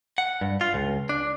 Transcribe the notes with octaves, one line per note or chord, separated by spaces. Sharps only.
F#5
G2
F4
C#2
D4